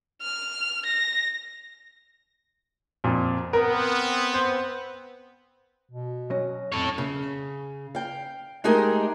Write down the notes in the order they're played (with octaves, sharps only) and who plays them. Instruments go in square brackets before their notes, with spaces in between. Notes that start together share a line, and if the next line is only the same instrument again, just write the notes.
[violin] F6
A#6
[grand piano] F2 A#2
[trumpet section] B3 C4 [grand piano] A#4
[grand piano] C5
[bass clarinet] B2
[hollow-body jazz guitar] F#3 C#4 D#5
[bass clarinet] F2 [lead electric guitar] A4 C#5
[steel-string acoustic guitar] C#3
F5 G5
G#3 A3 D#4 G4 G#4 A#4